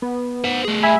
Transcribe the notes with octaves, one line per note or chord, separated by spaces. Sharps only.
B3
C5 F#5
A3 G#4
E5 G#5 B5